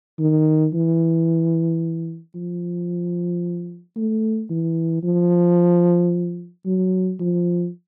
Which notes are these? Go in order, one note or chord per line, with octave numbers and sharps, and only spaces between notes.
D#3
E3
F3
A3
E3
F3
F#3
F3